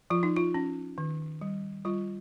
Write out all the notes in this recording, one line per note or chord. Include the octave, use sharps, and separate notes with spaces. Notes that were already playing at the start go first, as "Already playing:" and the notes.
F3 F4
D#4
F4
C#4
D#3
G3
G3 F4